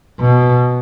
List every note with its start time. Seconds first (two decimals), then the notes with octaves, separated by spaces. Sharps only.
0.19 B2